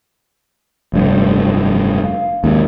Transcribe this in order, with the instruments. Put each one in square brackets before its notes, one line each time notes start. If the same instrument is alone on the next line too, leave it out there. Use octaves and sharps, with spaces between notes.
[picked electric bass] F1 G2 [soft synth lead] F3
[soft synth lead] F5
[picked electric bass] D#2 G#2